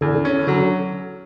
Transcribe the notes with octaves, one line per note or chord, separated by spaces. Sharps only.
E2 D3
C#4
D3 F#3